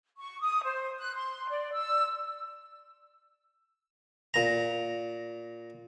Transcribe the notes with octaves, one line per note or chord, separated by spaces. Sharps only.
C#6
D#6
C5
F#6
C6
D5
E6
A#2 A#5